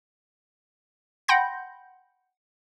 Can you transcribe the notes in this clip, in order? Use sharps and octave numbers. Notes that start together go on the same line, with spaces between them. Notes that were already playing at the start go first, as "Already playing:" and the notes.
F#5 G5 B5 C6 G6 A#6